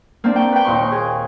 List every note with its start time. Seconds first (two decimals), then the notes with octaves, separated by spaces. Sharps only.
0.24 A#3 C4 D4
0.36 G5 C#6
0.52 B4 G5
0.64 D#2 A#2 C6 C#6
0.92 G#4